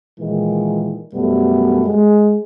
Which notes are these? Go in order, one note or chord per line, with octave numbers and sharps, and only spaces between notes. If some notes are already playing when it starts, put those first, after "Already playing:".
A#2 D#3 E3 G#3
F#2 B2 G3 A3 B3
G#3